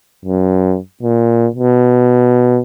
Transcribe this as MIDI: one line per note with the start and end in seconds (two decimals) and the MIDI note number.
0.25 0.77 42
1.02 1.47 46
1.56 2.60 47